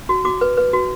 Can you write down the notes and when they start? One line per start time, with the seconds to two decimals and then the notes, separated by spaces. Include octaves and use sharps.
0.09 F#4
0.25 F#4 D6
0.41 B4
0.57 B4
0.73 F#4